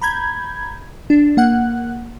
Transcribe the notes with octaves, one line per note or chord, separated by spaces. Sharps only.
A#5 B5 G6 G#6
D4
A#3 F#5 F#6